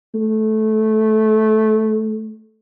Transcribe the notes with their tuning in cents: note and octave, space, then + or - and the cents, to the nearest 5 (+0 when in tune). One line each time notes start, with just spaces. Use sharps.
A3 -15